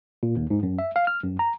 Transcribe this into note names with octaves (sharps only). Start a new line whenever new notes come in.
A#2
D#2
G#2
F#2
E5
F5
F6
F#2
A#5